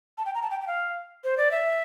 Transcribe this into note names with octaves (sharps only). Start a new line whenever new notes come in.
A5
G5
A#5
A5
G5
G5
F5
C5
D5
E5